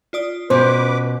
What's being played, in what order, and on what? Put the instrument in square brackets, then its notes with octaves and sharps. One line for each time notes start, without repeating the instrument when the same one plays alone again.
[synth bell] F4 D5 D#6
[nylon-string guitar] B2 C#4 [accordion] B4 D6 [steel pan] C5